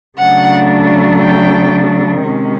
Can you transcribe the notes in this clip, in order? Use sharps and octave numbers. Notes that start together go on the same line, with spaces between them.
C#3 F#3 A3 D4 F#5
G5
C3 D#3 G#3 C#4